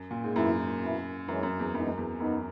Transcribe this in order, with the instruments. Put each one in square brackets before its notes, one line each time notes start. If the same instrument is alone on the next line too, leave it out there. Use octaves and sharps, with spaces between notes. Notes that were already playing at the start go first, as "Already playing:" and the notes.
Already playing: [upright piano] F#2
A#2
G#2
[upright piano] F#2 [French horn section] E3 B3 E4
[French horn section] B2 A#3 E4
[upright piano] F#2 [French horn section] E3 G#3 C#4
[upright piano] F#2
E2
[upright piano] F#2 [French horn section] E3 G#3 B3 D#4
[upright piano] F#2
E2
[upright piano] F#2 [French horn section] B3 D#4